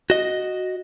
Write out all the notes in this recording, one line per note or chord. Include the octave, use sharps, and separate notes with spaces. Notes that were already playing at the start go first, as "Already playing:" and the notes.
F#4 D#5